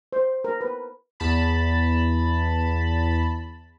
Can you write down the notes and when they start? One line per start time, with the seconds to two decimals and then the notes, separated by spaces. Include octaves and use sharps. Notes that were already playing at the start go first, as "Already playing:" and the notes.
0.13 C5
0.44 A#4
0.61 B4
1.20 E2 A5 B5